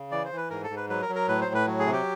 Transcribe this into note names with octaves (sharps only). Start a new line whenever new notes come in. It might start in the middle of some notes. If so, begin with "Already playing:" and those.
Already playing: C#3
E3 D5
C5
E3
B4
G#2 A#4
A4
G#2
B4
F#3 B4
A#4
F#3
A#4
A2 B4
C5
A2
B4
F#3
G#4
C3
G4